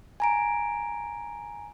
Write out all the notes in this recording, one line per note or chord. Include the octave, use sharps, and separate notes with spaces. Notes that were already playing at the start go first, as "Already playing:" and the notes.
G#5 A#5 D7